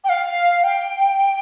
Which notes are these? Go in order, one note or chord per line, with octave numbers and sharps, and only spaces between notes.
G5
F5
G5